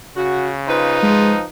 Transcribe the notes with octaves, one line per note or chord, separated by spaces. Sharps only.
C#3 F#4
D#4 F4 B4 C5
F3 G#3